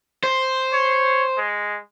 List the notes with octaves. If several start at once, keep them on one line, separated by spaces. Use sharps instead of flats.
C5
C#5
G#3